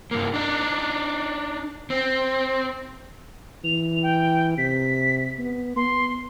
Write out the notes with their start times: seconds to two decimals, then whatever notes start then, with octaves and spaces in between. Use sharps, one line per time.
0.11 G2 A#3
0.34 D4 D#4
1.90 C4
3.64 E3 F7
4.03 G5
4.58 C3 B6
5.39 B3
5.76 B3 C6